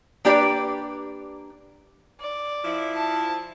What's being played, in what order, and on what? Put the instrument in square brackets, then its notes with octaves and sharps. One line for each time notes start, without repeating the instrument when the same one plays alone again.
[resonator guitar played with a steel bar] A#3 D4 G4 B4 D5
[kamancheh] D5
[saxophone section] F3 E4
[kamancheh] A5